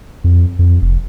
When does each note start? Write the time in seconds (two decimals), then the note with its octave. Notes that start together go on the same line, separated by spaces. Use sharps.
0.24 F2
0.59 F2
0.82 F1